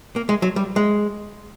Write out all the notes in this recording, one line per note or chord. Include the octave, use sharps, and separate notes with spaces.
A#3
G#3
F#3
G3
G#3